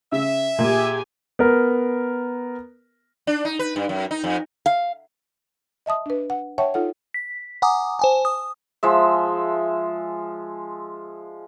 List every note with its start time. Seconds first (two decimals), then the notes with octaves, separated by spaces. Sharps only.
0.12 C#3 E5
0.59 A#2 G4 G#4 G#5
1.39 B3 A#4
3.27 D4
3.45 D#4
3.59 B4
3.76 G2
3.89 F#2
4.11 D#4
4.24 F2
4.66 F5
5.86 D#5 E5 A5 D#6
6.06 D4 B4
6.30 F#5
6.58 C#5 E5 F#5 G5 A5 C#6
6.74 D#4 F4 A4 F#5
7.14 B6
7.62 F#5 G#5 A#5 D6 D#6
7.99 C5 G#5 A5
8.25 D#6
8.83 F3 G#3 E5